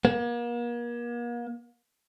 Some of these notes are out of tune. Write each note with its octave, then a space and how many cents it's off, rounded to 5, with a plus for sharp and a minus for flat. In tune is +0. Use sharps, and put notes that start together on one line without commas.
A#3 +40